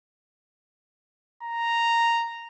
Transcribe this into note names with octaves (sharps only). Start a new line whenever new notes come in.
A#5